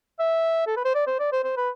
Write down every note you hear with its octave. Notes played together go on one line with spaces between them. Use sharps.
E5
A4
B4
C5
D5
C5
D5
C5
C5
B4